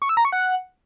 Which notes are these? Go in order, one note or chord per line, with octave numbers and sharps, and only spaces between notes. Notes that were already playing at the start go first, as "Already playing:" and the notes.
C#6
E6
A#5
C#6
F#5